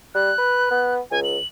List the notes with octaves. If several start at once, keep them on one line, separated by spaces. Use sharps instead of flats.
G3 F#6
B4
B3
C#2 G#5
F#7